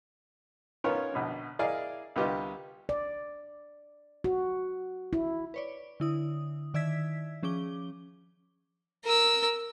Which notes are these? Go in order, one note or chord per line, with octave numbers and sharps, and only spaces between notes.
B3 C#4 D#4 F4 A#4 C#5
A#1 B2 D3
E4 G#4 A#4 D5 D#5 F5
C2 D3 B3 F4 G4 D#5
D5
F#4
E4
B4 C#5 D5
D3 E4 D#6
D#3 D5 E5 E6 G#6 B6
F3 C#4 G#4 D6 G7
A#4 E6